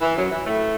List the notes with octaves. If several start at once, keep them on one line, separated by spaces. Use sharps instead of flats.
E3
F#2 F#3
E3
A2 A3